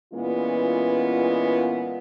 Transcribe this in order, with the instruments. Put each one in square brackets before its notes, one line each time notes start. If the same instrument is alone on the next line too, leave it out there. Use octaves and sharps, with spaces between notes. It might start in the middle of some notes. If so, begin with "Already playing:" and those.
[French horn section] A#2 E3 G#3 B3 C#4 F4